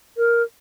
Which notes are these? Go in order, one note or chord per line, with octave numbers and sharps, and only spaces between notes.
A#4